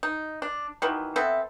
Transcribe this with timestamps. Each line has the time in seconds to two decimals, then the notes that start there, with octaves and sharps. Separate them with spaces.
0.03 D#4
0.42 D4
0.82 B2 D#3 E3
1.16 B3 C4 A4 E5